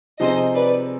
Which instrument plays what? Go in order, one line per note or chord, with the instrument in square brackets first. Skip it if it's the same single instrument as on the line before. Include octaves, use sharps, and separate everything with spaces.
[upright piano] C3 F3 C4 D#4 G#4 [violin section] C5 D#5
[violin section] B4 D5